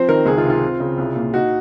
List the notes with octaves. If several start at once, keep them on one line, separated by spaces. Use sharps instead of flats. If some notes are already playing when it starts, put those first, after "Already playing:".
Already playing: F3 C4 C5
D#3 A#4
C#2 G#4
F4
C3
F4
C4
C#3
C2
A#2
D#4 F#4